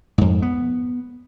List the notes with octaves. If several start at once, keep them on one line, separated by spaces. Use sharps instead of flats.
F2 G#2
B3